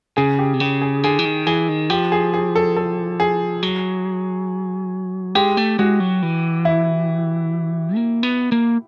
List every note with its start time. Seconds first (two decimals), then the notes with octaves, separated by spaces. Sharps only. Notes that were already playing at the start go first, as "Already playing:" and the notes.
0.17 C#3 G#4
0.39 G4
0.54 C3
0.60 C#3 G4
0.82 G#4
1.03 D3 G#4
1.19 E3
1.25 D#3
1.47 E3 G#4
1.69 D#3
1.90 F3 G4
2.12 G#4
2.34 G#4
2.55 A4
2.76 A4
3.20 G#4
3.63 F#3
5.35 G#3 G4
5.57 A3
5.79 G#3 F#4
6.00 F#3
6.22 E3
6.65 E4
7.95 A#3
8.23 B3
8.52 A#3